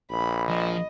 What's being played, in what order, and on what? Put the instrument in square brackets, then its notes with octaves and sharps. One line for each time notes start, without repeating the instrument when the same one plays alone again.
[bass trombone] A#1 [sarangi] B5
[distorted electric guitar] F3 [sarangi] D#5